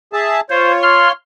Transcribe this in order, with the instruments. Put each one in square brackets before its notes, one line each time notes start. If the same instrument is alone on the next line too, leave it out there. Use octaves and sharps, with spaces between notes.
[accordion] G#4 E5 A5
[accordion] F4 C#5 [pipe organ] C5
[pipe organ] C6 F6